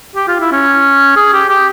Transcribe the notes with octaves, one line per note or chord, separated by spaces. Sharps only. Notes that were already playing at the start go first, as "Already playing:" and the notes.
G4
F4
E4
C#4
G#4
G4
G4